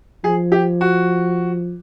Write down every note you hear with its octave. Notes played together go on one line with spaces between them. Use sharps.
F3 G#4
G4
F#4